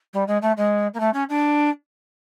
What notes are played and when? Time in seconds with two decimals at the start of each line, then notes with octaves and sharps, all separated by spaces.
0.13 G3
0.27 G#3
0.42 A3
0.57 G#3
0.93 A#3
0.99 A3
1.13 C#4
1.29 D4